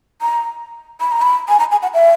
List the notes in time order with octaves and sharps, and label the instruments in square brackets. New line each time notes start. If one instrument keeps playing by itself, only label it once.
[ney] A#5
B5
A#5
B5
G#5
A#5
G#5
F#5
E5